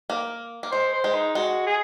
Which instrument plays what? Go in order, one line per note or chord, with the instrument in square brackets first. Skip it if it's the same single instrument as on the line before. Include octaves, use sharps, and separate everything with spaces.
[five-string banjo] A#3
A#3
[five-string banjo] G#3 [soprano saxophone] C5
[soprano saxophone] C5
[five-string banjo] G#3
[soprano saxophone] D#4
[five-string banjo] G#3 [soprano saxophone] F#4
[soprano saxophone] G#4